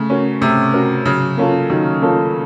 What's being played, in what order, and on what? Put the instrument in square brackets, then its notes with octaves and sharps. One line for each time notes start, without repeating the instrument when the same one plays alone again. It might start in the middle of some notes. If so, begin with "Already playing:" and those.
Already playing: [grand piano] C#3 [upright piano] A3
[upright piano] C#4 F#4 A#4
[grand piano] C3 [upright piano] A3
[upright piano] C#4 F#4 A#4
[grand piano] C#3 [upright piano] F#3
[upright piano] A#3 C#4 F4 A4
[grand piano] D#3 [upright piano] F#3
[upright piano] A#3 C#4 F4 A4